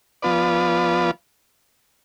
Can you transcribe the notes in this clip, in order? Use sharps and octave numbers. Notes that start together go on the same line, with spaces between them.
F3 B3 F4 B4 D5